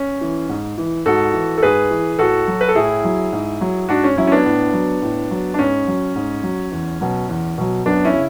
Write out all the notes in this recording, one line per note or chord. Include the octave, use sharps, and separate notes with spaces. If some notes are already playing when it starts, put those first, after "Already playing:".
Already playing: C#4
E3
G#2
E3
G#2 F#4 A4
E3
A4
G#2 G#4 B4
E3
A2 F#4 A4
F#3
B4
A4
A2 E4 G#4
F#3
G#2
F#3
G#2 D4 F#4
C#4
F#3 C#4 E4
C#4
B3 D4
A2
F#3
A2
F#3
D4
G#2 C#4
F#3
G#2
F#3
E2
B2 F#3
E2
B2 F#3
F#2 B3 D4
C#4 E4
C#3